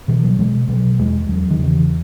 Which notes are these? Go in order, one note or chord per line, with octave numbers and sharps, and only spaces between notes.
B2 E3
F#3
B2 G#3
B2 F#3
E2 G#3
E2 F#3
D#3
C#3 E3